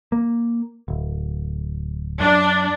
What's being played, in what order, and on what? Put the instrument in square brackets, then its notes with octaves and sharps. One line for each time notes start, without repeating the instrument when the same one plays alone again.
[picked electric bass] A#3
D1
[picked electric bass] F#2 [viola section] D4